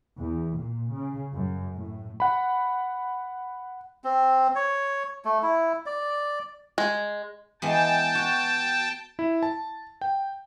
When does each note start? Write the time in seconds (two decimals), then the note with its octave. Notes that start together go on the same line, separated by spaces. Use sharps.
0.18 E2
0.56 A#2
0.93 C#3
1.34 F#2
1.77 A2
2.20 F#5 B5
4.04 C4
4.55 C#5
5.25 A3
5.43 E4
5.86 D5
6.78 G#3
7.62 E3 G#3 B3 G5 A5
8.15 F#4
9.19 E4
9.43 A5
10.01 G5